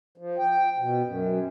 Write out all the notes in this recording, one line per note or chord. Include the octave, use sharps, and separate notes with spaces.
F3
G5
B2
F#2